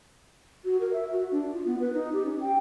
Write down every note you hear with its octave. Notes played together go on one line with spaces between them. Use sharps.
F#4
A#4
E5
F#4
D4
F4
B3
B4
D#4
G4
C#4
G5